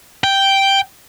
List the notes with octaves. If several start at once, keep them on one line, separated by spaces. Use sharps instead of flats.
G5